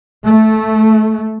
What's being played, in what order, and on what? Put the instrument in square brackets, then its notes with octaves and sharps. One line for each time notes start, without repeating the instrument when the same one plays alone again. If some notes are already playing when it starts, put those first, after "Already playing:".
[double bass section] A3